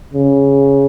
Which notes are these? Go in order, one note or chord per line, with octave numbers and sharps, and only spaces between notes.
C#3